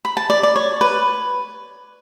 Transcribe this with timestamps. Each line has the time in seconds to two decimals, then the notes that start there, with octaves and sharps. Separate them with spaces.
0.05 B5
0.17 A5
0.30 D5
0.43 D5
0.56 C#5
0.81 B4